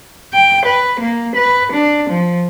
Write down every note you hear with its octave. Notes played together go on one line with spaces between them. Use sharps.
G5
B4
A#3
B4
D4
F3